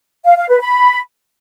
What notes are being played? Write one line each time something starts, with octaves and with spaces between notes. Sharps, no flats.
F5
F5
B4
B5